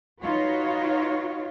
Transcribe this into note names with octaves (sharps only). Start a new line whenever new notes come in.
D#4 F4 F#4 B4 C#5